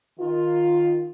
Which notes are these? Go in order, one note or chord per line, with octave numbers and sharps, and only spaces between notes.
D#3 F4